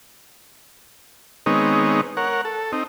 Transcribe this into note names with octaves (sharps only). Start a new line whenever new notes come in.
D#3 G#3 B3 C4 D#4 C#5
A#4 C#5 F#5
A4
C4 D#4